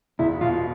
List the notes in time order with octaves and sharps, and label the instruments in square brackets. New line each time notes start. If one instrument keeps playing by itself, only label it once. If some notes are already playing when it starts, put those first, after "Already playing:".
[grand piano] E1 [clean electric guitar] E4
[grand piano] B2 [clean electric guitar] F4